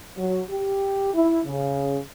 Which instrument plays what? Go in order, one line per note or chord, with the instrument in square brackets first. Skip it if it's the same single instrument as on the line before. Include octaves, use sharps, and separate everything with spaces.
[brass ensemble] F#3
G4
E4
C#3